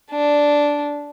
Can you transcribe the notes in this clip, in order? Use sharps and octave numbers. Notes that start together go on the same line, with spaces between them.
D4